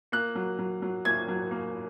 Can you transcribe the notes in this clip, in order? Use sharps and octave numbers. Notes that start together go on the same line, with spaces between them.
A#3 F#6
F#3
F#3
F#3
A#3 G#6
F#3
A#3